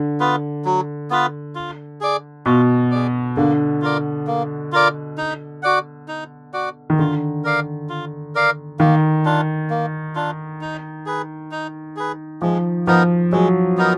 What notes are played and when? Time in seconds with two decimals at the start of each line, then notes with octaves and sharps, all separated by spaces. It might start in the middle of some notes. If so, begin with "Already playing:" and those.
Already playing: D3
0.20 B3 F4 B4
0.65 F#3
1.11 B3 F4 B4
1.55 F4
2.01 G#4 D5
2.46 B2 F4
2.91 G#4 D5
3.37 D3 A#3
3.82 F4 A#4 D5
4.27 A#3
4.72 F4 A#4 D5
5.18 D#4
5.63 F#4 D5 F#5
6.08 D#4
6.53 F#4 D5 F#5
6.90 D#3
6.99 D3 F4
7.44 A#4 D5 F5
7.89 F4
8.35 A#4 D5 F5
8.80 D#3 A#3
9.25 D4 F4
9.70 A#3
10.15 D4 F4
10.61 D#4
11.06 G#4 B4
11.52 D#4
11.96 G#4 B4
12.42 F3 G#3
12.87 F3 B3 D#4 A#4
13.32 F#3 G#3
13.77 B3 D#4 A#4